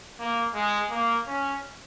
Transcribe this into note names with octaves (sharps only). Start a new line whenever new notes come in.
A#3
G#3
A#3
C#4